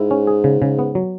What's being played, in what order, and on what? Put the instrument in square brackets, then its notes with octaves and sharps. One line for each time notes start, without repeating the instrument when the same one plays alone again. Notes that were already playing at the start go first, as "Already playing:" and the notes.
Already playing: [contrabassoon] G#2 [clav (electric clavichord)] E4
[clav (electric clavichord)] C#4
G#4
C#3
C#3
B3
F#3